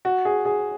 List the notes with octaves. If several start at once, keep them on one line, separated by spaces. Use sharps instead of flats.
F#4
G#4
G#4